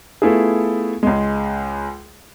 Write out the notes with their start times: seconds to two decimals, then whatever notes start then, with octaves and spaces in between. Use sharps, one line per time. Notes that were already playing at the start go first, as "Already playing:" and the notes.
0.22 A3 B3 E4 F4 G#4
1.03 C#2 G#3